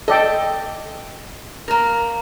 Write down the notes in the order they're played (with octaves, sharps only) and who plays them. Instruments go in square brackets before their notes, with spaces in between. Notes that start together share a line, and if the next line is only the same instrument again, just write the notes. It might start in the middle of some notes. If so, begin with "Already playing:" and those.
[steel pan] A4 D5 G5 [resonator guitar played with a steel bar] D#5
[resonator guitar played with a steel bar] A#3 A#4